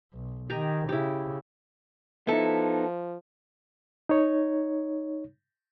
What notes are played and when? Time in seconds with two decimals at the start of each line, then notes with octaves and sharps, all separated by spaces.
0.13 B1
0.50 D#3 G4 G#5 A#5
0.89 C#3 E4 G4
2.27 F3 B3 D#4 E4 A4
4.09 D#4 C#5